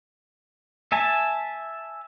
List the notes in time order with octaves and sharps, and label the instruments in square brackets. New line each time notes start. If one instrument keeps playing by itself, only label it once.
[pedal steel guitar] E5 G#5 A5